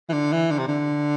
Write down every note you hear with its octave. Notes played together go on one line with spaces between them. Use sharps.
E3
D3
E3
D3
C3
D3